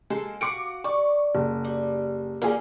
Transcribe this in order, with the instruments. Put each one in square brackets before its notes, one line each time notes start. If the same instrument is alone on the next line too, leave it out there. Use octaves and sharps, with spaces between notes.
[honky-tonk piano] G#3 [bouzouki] A#3 A4 C5
[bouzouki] F#4 F5 F#5 [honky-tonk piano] D6 C#7 D7
[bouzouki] D5 [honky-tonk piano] C#6
[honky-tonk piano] F#1
[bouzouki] G3
[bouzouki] D3 C#4 [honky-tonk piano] A#3 F4 G#4